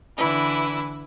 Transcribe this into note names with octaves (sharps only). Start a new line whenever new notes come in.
D3 E3 E4 B4